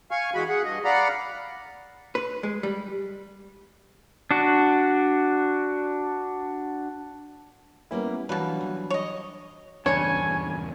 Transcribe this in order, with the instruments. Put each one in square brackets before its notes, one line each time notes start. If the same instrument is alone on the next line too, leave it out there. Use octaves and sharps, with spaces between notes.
[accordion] F5 G#5 C#6
E3 G#3 F#4 B5
G#4 F#5
G2 D#5
D5 F5 F#5 A#5 B5
[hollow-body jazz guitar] B4
G#3
G3
[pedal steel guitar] D4 F#4
[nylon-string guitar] G3 A#3 B4 [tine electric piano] B3 C#4 E4
[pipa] B2 B4 [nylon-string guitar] E3 F5 A5 [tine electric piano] F#3 G3 D4
[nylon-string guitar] E3
[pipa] C#5 D#5
[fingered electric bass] D#1 E2 G2 [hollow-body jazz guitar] C#3 D4 [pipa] C#5 [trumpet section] G#5